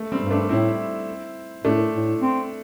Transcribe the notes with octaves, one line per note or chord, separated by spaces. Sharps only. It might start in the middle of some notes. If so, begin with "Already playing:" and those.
Already playing: A3
G3 C4
G2
A3 D4
A2 C4 E4
A2 A3 D4
A2
C4